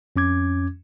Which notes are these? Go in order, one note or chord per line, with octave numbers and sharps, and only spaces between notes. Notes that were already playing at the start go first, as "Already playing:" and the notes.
F2 C#4 D6 G#6